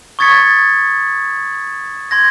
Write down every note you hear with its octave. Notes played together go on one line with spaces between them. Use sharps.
C#6 D#6 G#6 A6 B6 C#7
C6 G#6 A#6